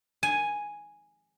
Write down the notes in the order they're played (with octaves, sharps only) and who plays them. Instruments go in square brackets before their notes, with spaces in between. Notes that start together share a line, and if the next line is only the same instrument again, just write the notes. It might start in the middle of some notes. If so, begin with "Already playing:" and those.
[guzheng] G#5